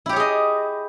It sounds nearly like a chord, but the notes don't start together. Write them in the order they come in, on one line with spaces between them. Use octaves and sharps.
E4 G4 C#5 G#4 D#5